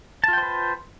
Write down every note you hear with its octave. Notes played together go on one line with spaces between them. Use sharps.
F4 B4 C5 G5 A5